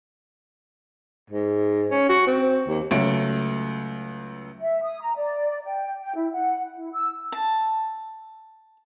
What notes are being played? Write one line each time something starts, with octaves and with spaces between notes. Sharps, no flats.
G#2
C#4
F#4
C4
D#2
C#2 F#3 A3 D7
E5
D#6
A#5
D5
G5
G5
E4
F#5
E4
E6
A5